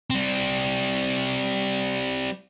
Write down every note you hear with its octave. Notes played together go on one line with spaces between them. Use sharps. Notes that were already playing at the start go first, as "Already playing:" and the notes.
G3 C4